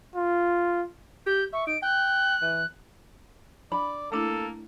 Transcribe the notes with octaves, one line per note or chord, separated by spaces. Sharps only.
F4
G4 G6
E5 C#6
D#4 D7
G5 F#6
E3
D4 D5 B5
A3 A#3 D4 E4 A4